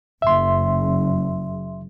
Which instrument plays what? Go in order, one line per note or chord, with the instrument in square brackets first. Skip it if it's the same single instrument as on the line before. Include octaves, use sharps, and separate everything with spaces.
[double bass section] F#1 [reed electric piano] E5 C6